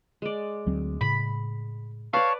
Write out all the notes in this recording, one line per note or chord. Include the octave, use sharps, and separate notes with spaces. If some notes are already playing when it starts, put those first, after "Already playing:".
G#3 D5
D2 F#3 C4
A2 C#3 B5
B4 C#5 D5 F5 A5 C#6